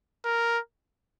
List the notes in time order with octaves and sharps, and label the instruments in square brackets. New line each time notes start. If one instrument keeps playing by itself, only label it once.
[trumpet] A#4